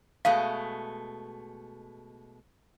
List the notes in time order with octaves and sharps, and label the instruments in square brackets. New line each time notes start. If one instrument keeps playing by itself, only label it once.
[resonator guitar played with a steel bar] B2 G#3 A3 [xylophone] F5